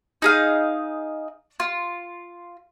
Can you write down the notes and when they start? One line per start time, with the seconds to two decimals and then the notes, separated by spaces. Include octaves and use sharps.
0.22 D#4 G#4 F5
1.60 F4